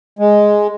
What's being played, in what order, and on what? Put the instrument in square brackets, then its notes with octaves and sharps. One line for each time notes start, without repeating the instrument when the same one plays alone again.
[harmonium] G#3